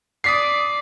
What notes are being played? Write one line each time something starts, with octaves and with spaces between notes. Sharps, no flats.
D5 D#6 B6 C7